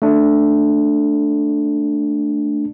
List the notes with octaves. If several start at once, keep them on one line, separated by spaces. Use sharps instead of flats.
A3 D4